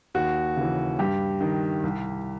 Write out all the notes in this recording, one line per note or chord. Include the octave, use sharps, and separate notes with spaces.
D#2 F#4
C#3 E3
G2 G4
D#3
C2